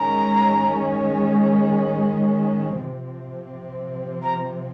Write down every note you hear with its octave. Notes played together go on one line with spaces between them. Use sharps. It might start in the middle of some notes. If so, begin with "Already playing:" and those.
Already playing: D#3 G#3 C#4 A#5
C3 F3 C4
A#5